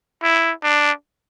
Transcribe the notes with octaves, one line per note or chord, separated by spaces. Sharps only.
E4
D4